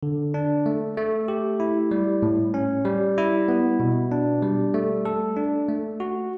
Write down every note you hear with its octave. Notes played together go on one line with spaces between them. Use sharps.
D3
D4
A3
A3
G4
E4
G3
A2
C#4
G3
E4
B3
B2
D4
G3
A3
A4
D4
A3
F#4